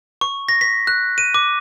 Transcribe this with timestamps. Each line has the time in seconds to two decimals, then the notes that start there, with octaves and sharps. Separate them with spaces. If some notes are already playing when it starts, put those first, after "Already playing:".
0.21 C#6
0.49 A#6
0.61 B6
0.87 F#6
1.18 D#7
1.34 D6